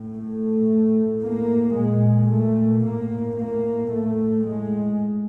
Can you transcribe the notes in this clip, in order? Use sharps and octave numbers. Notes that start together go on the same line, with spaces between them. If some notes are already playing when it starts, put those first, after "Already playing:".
Already playing: A2
A3
A2
A#3
A#2 G#3
A3
A2 A#3
A#3
A2 A3
G#3